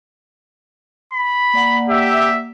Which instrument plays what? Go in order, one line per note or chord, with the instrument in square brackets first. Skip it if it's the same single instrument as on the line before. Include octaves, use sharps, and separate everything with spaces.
[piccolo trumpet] B5
[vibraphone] A#3 D5 F#5
[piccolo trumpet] G4 [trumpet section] E5